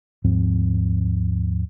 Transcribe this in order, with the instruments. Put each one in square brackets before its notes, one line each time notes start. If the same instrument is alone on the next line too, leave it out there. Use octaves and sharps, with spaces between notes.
[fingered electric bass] D#2 G#2 F3 C4